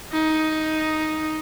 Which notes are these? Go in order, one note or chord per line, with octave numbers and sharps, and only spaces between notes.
D#4